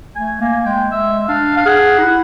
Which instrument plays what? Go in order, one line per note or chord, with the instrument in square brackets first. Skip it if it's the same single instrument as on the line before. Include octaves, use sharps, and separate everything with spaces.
[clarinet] A3 [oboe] G#5
[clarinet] A#3 [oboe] G#5
[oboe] G#5
[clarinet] G#3 [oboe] G5
[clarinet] G#3 [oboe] E5
[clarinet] D4 [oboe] F5
[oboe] F5
[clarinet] G#4 [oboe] F#5
[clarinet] D#4
E4